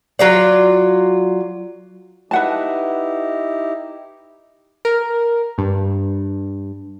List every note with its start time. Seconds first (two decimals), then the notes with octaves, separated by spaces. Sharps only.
0.19 F#3 F4 D5
2.31 D#4 E4 G4 B4 F#5 A5
4.85 A#4
5.58 G2